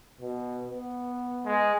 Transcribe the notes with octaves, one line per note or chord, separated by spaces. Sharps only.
B2
B3
G#3